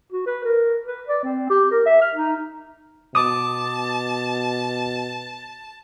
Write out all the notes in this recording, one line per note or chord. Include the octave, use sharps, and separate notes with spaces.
F#4
B4
A#4
B4
D5
C4
G4
A#4
E5
F6
D#4
B2 A5 D6 D#6